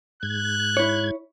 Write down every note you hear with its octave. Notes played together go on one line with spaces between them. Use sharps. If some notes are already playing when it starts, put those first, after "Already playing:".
G#2 F#6 G#6
E4 C#5